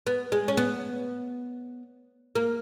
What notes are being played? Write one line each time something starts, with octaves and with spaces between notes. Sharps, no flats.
B3
G#3
C#4
B3
A#3